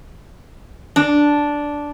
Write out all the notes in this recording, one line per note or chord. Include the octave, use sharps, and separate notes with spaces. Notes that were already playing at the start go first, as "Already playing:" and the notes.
D4